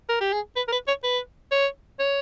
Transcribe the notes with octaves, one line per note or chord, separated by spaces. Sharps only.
A#4
G4
G#4
B4
A#4
B4
C#5
B4
C#5
C#5